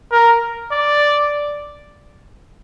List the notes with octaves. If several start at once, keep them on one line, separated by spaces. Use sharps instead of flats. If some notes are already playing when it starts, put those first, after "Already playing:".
A#4
D5